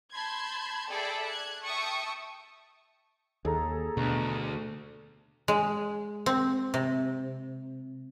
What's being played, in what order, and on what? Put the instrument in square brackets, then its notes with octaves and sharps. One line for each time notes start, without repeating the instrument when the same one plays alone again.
[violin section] A5 B5 C6 G6 G#6
G#4 A4 D5 E5 G5 B5
F#6 G#6
E5 G5 A5 C#6 D#6
[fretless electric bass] D#2 [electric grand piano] G#4 A4 A#5
[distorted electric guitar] D2 [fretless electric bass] B2
[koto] G#3
C4
C3